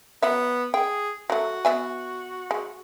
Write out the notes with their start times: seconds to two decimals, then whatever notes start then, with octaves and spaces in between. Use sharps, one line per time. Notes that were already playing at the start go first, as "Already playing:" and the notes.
0.22 F#3 B3 E5
0.74 G#4 G5
1.30 F#3 A3 F#4
1.65 B3 E5 G#5
2.51 G#3